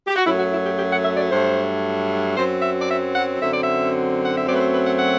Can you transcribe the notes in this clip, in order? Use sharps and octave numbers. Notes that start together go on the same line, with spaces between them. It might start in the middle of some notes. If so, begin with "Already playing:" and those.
G4
F#4
F#2 F#3 A3 E4
F#4
E4
G4
G4
F#5
E5
D5
G2 F#3 A3 C5
F#2 F#3 C4 C5
E5
D5
E5
F#5
F#2 D3 F#3 C4 E5
D5
E5
F#5
E5
F#2 F#3 A3 C4 D5
B4
C5
B4
F#5
F#5